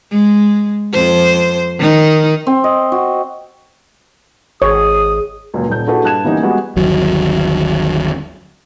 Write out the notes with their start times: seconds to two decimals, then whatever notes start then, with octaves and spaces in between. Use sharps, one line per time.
0.11 G#3
0.93 F2 C5
1.79 D#3 D#4
2.47 C4
2.64 D#5
2.92 F#4
4.62 G#1 G#4 C#5 D#6
5.54 C#2 F#2 A#2
5.69 D#1 G6
5.87 D4 E4 F#4 G#4 A4 B4
6.04 G2 A5 F#6 G#6 E7
6.25 E3 G3 A#3 B3 C#4 D#4
6.43 G3 G#3 B3 F#4
6.76 G1 D#2 F#3